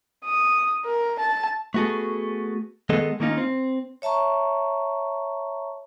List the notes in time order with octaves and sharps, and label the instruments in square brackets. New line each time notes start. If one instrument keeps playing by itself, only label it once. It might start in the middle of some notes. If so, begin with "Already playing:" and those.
[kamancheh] D#6
A#4
A5
[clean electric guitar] A3 B3 F#4 G#4 A4
D#3 G#3 B3 G#4 A4 D#5
D#3 A#3 C#4 D#4 F4
C4
[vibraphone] C#5 E5 A5 A#5 C#6